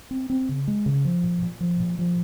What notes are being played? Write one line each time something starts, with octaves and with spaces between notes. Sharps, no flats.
C4
C4
C#3
G#3
C#3
F3
A#2
A#2
F3
A#2
F3